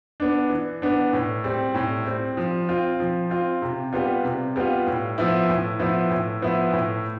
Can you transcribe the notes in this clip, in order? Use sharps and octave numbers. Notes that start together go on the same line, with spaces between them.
B3 D4
E3
B3 D4
A2
G3 C4
A2
G3 C4
F3
C4 F4
F3
C4 F4
C3
G3 B3 F4
C3
G3 B3 F4
A2
F3 B3 E4
A2
F3 B3 E4
A2
F3 B3 E4
A2